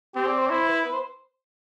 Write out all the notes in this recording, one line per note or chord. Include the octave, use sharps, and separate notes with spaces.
C4 G4
D5
C5
D5
E4 C5
B4
B4
C5